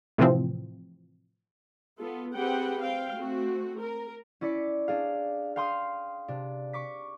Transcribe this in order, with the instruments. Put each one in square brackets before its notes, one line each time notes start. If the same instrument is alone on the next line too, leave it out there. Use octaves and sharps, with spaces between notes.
[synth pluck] A2 C3 E3 F3 C4
[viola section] B3 F4 A4
C4 G4 G#4 B4 F#5 G5
C4 F5 G5
A3 C4 F#4
A#4
[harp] C#4 E4 D5 D6 B6 C#7
D4 G#4 F5
F5 G5 C6 D#6 F6
C3 D4
C#6 D6 B6